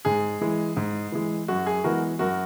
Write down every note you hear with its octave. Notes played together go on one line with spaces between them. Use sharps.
G#2 G#4
E3 G#3
G#2
E3 G#3
F#2 F#4
G#4
E3 G#3 B3 F#4 A#4
F#2 F#4 A#4